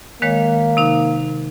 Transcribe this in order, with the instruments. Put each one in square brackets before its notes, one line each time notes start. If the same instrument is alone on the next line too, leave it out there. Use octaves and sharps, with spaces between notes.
[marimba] D#3 G#3 C#5 [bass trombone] A#3
[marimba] C3 D#4